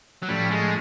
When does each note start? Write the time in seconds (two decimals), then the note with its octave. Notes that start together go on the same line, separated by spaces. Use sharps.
0.23 F#3
0.28 A2 F3 G3 A3 C#4
0.51 G#3